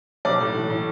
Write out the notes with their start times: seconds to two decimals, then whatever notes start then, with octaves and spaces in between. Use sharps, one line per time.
0.25 B1 D5
0.41 A2
0.54 E3
0.70 A2